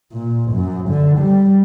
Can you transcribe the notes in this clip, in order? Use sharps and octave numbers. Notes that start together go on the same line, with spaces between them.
A#2
F#2
D3
G3